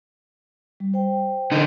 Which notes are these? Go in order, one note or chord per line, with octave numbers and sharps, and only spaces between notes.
G3
C5 G5
D3 D#4